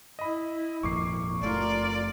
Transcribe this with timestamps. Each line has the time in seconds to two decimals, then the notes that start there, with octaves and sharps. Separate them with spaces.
0.19 E4 D#5 B5
0.83 G#1 F2 A#2 C#6 D6 C7
1.41 F#1 A3 F4 A#4 D5